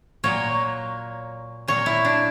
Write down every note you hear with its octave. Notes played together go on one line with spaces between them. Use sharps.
A#2 F#3 A#3 C#5
A#2 F#3 A#3 C#5
E4
D4